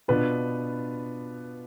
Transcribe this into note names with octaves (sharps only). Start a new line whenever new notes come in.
B2 B3 D4 F4 B4